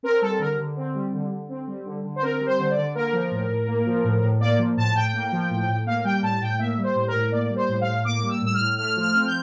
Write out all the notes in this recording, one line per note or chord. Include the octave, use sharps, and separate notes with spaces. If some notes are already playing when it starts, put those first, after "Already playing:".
C4 A#4
G3 A4
D3 A#4
D3
C4
G3
D3
D3
C4
G3
D3
D3
C5
C4 A#4
G3
C5
D3
D5
D3
A#3 A#4
F3
A2
A2
A#3
F3
A2
A2
A#3 D5
F3
A2 A5
A2 G5
A#3
F3
A2
A2
A#3 F5
G3 G5
A2 A5
A2 G5
A#3 E5
G3
C5
A2
A#4
A2
A#3 D5
G3
C5
A2
F5
A2
A#3 D6
G3
E6
A2 E6
F6
A2
A3 F6
F3
F6
C4
G6